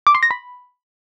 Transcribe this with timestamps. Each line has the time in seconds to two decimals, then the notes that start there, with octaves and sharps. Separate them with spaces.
0.07 D6
0.15 C6
0.23 A#6
0.31 B5